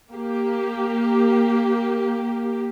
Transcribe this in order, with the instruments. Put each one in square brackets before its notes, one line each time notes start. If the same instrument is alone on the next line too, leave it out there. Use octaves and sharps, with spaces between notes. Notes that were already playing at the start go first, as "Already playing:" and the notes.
[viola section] A#3 G4